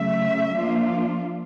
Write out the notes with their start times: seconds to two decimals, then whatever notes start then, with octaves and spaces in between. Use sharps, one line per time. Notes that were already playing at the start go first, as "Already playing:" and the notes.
Already playing: C#3 F#3 A3 E5
0.55 F3 A#3 D4 F4